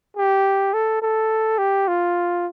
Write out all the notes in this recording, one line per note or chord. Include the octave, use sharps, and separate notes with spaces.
G4
A4
A4
G4
F4